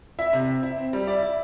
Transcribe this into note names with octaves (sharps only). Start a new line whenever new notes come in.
E4 E5
C3
C4
E4
C4
G3
E4 D5
E4